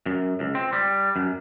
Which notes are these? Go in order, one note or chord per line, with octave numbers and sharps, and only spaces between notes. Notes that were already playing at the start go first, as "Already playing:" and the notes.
F#2
C#2
C4
G3
F#2